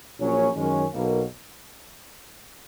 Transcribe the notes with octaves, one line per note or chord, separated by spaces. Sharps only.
A#1 A#2 F#3 C#4
F#2 D#3 G#3 C#4
B1 B2 A#3